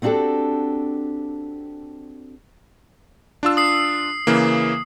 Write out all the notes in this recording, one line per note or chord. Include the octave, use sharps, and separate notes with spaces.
B3 C4 D4 F#4 G4 A4
D4 F4 E6
D#6 C7
C#3 E3 A#3